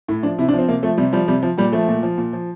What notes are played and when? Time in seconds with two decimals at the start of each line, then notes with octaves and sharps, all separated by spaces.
0.08 A2 E4
0.23 F3 D4
0.38 C3 E4
0.48 D4
0.53 F3
0.58 C4
0.69 C3 A#3
0.83 F3 A3
0.98 C3 G3
1.13 F3 G3
1.28 C3 G3
1.43 F3
1.58 A#2 G3
1.72 F3 A3
1.88 A#2
2.03 F3
2.18 A#2
2.33 F3